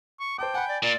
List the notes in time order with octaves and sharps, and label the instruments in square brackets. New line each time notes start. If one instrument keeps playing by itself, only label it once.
[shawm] C#6
[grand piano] C5 A5 D6 [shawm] G5
[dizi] F#5 [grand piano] G#5 B5
[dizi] D5
[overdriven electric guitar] A#2 [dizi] D5